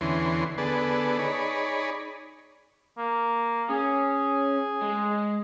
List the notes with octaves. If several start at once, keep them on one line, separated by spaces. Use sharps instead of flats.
E2 D3 E3 C#4 C6
D3 B3 G#4 A4 B4 D5
D#4 G#4 C#5 D5 B5
A#3
C#4 G#4
G#3